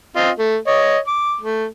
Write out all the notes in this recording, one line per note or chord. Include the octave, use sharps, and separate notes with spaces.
C4 F4 D#5
A3
C#5 D#5
D6
A3